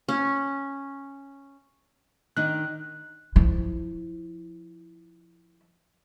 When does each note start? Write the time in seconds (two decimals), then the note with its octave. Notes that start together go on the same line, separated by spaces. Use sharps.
0.09 C#4
2.37 D#3 D4 D#4 F#6
3.36 F3 E4